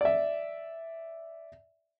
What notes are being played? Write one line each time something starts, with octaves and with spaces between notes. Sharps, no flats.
D5 E5